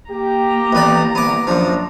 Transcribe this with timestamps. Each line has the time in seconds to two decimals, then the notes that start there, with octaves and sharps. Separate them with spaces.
0.10 A#3 G4 A#5
0.73 A1 B3 D5
1.15 C2 B3 D6
1.47 F#2 F3 D4